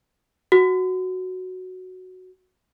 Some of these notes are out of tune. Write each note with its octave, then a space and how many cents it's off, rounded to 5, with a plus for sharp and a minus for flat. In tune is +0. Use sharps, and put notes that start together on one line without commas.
F#4 +0